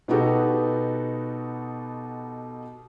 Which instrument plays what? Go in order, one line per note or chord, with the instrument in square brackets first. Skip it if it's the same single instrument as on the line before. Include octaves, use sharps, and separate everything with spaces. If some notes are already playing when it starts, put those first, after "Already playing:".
[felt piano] B2 B3 D#4 F#4 G4 A4